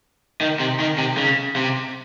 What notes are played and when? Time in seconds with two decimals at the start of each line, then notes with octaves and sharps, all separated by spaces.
0.41 D#3
0.60 C3
0.79 D#3
0.98 C3
1.17 C#3
1.56 C3